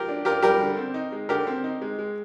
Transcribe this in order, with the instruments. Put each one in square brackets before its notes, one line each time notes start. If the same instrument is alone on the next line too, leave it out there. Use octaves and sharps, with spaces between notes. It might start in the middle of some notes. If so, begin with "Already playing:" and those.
Already playing: [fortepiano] F4 G4 A#4
[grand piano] D4
[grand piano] F4 [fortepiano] G4 A#4
[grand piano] G3 [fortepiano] G4 A#4
[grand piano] D3
C4
D#4
G#3
[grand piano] D3 [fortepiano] G4 A#4
[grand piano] C4
D#4
G#3
G#3